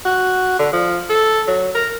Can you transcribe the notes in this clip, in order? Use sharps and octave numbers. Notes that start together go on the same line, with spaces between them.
F#4
D3
F3
A4
F#3
A#4